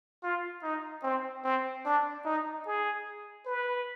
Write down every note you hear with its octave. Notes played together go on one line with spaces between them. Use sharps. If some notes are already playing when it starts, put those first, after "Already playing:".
F4
D#4
C4
C4
D4
D#4
G#4
B4